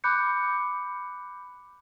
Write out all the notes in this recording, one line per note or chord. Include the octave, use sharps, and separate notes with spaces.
B5 D6 F#6 G6 C#7